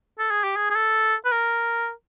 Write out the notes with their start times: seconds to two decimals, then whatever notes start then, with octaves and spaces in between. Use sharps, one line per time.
0.19 A4
0.31 G#4
0.44 G4
0.56 G#4
0.70 G#4
0.76 A4
1.25 B4
1.32 A#4